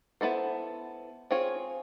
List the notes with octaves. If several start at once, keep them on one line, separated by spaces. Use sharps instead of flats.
B3 E4 A4 C5
C4 F4 G#4 C#5